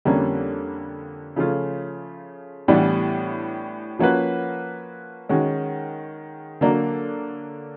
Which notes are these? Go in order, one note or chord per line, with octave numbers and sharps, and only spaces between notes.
F2 D3 G3 A#3 C#4
C#3 F3 A3 C#4 F4
A2 E3 G3 B3 D4
F3 A#3 C#4 F#4 B4
D#3 G#3 C#4 F#4
D3 F#3 A#3 D4